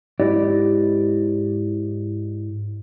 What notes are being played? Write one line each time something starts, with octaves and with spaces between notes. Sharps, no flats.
G#2 E4 G4 D5 D#5